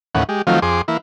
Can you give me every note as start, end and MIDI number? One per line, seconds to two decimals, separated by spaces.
0.15 0.24 39
0.15 0.24 45
0.15 0.24 52
0.15 0.24 61
0.15 0.24 78
0.29 0.42 56
0.29 0.42 67
0.47 0.60 51
0.47 0.60 53
0.47 0.60 54
0.47 0.60 57
0.47 0.60 60
0.47 0.60 65
0.62 0.82 41
0.62 0.82 68
0.62 0.82 84
0.62 0.82 86
0.88 0.97 52
0.88 0.97 58
0.88 0.97 64